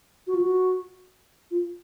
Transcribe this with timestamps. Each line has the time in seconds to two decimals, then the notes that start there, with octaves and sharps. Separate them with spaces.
0.27 F#4
0.35 F4
0.41 F#4
1.51 F4